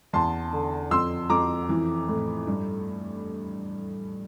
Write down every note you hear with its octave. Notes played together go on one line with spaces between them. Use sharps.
E2 A5 C6
D3
F2 C6 E6
F2 A#5 D6
E3
A2
G2